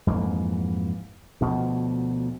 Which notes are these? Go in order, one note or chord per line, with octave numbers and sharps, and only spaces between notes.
F2 G#2 E3 A#3
D2 B2 F3